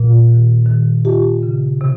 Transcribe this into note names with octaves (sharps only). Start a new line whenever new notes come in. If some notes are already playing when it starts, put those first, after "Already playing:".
Already playing: A#2
D#3
D#3
F4 G4
C#3
C3